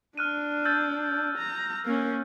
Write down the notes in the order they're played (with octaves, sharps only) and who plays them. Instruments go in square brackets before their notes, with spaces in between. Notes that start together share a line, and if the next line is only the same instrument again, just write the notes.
[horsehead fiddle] D4 [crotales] F6 F#6 D#7
[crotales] E6 G6 A6
[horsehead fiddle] A#5
A#3 C#4